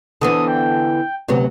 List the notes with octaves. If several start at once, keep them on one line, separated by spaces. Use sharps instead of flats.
D3 E3 B3 D#6
G5
D2 C3 F#3 B3